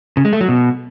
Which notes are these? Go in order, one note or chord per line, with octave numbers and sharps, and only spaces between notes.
C#3
G#3
A3
F#3
B2